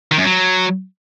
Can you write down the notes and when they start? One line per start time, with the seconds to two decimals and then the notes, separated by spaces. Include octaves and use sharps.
0.11 D#3
0.18 F#2
0.25 F#3